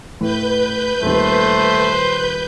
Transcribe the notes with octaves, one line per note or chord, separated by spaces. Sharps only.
A2 B4 G6
D#1 D#2 A3 C5